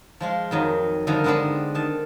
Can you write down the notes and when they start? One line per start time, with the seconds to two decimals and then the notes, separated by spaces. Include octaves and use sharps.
0.20 F3 G#3 F4
0.51 F2 D#3 F#3
1.07 D3 D#3 F3 G3 A#4 A#5
1.24 D3 G#3 B3 C4 D4
1.75 D#3 A5